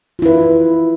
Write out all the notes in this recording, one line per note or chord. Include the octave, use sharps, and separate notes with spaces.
E4 F4 B4